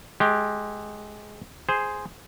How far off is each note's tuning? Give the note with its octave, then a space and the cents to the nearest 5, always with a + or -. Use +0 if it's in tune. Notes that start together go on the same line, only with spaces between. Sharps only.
G#3 +15 G4 +0
G#4 +0 C5 +0